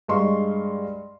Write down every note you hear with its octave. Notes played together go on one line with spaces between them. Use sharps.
G2 G#3 D#5 F5 C6 C#6